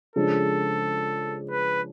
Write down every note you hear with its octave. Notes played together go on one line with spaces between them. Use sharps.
C#3 F3 G#3 D4 A4
B4